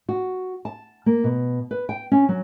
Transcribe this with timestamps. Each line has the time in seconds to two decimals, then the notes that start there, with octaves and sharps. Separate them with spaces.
0.09 F#4
0.65 A5
1.06 A#3
1.24 B2
1.71 B4
1.89 G5
2.12 C#4
2.29 F#3